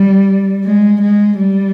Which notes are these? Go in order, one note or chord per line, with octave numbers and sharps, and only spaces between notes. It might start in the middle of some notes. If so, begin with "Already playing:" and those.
Already playing: G3
G#3
G#3
G3